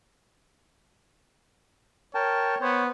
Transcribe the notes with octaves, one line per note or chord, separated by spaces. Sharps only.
A#4 C#5 G5 A5
B3 C5 C#5